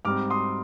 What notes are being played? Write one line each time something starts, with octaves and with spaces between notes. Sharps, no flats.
G#2 G3 C4 D6 F6
C6 D#6